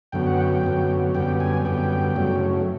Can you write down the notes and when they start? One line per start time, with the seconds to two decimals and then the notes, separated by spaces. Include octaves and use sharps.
0.12 F#2 D3 F#3 B3 G5
0.27 F#5
0.41 G5
0.63 F#2 D3 F#3 B3
1.15 F#2 D3 G3 B3 G5
1.40 G#5
1.65 F#2 D3 G3 B3 G5
2.16 F#2 C#3 F#3 A3